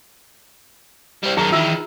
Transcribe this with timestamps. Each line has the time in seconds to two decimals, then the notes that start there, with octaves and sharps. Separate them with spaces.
1.23 G3 C4
1.37 F#2 D#3 D#4 G#4 A#5
1.52 D#3 E3 F4 E5 E6